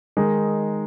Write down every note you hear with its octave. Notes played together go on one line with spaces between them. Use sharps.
D#3 G#3 D#4